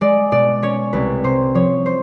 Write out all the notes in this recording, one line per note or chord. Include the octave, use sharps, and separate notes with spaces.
G#3 D5
B2 D5
C#4 C#5
C2 B4
C3 C5
F3 C#5
C5